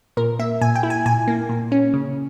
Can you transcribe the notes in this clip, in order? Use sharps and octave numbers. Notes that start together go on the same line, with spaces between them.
A#2 A#4
A#3 E5
A#2 G#5
G5
E4
G#5
A#2 G#5
A#3
A#2
C#4
C#3